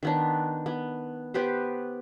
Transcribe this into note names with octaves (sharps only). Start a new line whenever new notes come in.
D#3 B3 D4
B3
B3 G4 B4 C5